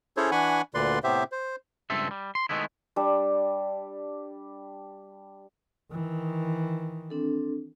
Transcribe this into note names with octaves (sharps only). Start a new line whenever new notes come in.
C#4 E4 G#4 A4 C5 C#5
E3 D4 F#5 G#5 B5 C#6
D2 A#2 D3 B4 D5 C6
A2 C3 B3 G4 C5 E5
C5
C#2 G2 C4 A4 E5
G3
C6
D#3 G#3 A3 B3 E4
G3 D4 E6
D#3 E3
C4 D4 A4